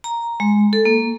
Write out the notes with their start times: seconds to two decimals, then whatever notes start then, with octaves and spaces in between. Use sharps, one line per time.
0.04 A#5
0.40 G#3
0.73 A4
0.85 A#3